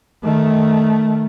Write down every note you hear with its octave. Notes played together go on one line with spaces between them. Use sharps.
D#3 A3